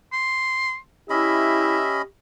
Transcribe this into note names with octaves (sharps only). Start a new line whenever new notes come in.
C6
C#4 E4 G4 D#5 E5 B5